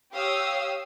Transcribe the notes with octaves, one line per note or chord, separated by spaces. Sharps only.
G4 C#5 F5 D#6 E6